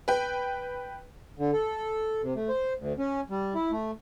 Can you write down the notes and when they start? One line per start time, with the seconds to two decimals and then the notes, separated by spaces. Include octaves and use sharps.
0.08 B4 G5
1.39 D3
1.53 A4
2.23 C3
2.36 A3
2.49 C5
2.79 D2
2.98 C#4
3.30 G3
3.55 E4
3.71 A3